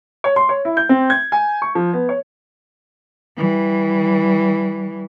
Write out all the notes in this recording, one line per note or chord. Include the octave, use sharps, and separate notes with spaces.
C#5
C6
C#5
E4
G6
C4
G#6
G#5
C#6
F3
B3
C#5
E3 G3